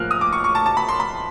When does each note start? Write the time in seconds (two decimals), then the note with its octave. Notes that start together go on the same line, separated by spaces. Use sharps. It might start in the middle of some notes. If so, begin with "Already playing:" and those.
Already playing: A2 F3 A#3 F6 F#6
0.11 D#6
0.21 D6
0.33 C#6
0.44 C#6
0.55 A5
0.66 A5
0.77 B5
0.89 C6
1.00 B5